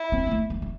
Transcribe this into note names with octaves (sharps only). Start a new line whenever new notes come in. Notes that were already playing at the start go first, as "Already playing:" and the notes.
Already playing: E4
C4
G3
A3
G3
G3